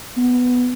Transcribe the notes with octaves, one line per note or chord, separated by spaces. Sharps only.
B3